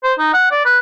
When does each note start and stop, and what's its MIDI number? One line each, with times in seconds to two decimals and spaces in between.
0.04 0.13 72
0.19 0.31 63
0.34 0.49 78
0.51 0.63 74
0.65 0.79 71